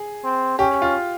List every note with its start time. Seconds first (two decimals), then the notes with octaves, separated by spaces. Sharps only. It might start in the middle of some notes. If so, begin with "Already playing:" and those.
Already playing: G#4
0.24 C4
0.59 C#4 G4
0.82 F4